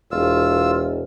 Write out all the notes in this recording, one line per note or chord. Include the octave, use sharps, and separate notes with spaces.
E1 F4 E6